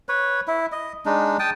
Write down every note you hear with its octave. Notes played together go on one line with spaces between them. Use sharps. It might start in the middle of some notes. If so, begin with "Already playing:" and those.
B4 C#5
E4
D#5
G#3 D4 D#4
G5 A5 D#6